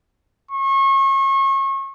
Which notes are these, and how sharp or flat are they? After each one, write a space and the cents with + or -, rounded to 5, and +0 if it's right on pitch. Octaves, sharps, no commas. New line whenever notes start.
C#6 -35